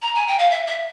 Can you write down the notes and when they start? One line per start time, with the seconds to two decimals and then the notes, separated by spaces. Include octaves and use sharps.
0.02 A#5
0.14 G#5
0.27 G5
0.38 F5
0.50 E5
0.67 E5